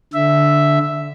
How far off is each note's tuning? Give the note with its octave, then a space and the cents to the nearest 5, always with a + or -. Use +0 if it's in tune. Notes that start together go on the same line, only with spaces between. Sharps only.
D3 -5 E5 +0